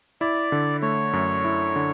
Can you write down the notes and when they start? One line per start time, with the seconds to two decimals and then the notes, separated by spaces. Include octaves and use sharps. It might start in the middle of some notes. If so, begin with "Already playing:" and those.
0.21 E4 D5
0.52 D3
0.82 A3 C#5
1.13 F#2
1.45 E4
1.76 D3